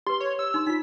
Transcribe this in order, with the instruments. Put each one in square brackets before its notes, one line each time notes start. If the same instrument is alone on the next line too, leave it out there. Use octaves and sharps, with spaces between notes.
[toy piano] G4 B4 [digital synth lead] C6
[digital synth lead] C#5
E6
[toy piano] D#4 C6
[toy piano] D#4 F4 [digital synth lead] B6